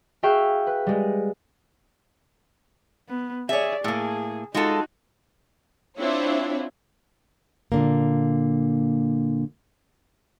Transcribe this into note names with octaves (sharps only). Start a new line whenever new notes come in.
F#4 G#4 E5 F5 G5 C#6
B4
G3 G#3
B3
G#4 C#5 D5 E5
A2 A#3 G#4
G#3 D#4 F4 F#4 A4
C4 D4 E4 F4 C#5
A#2 D3 A#3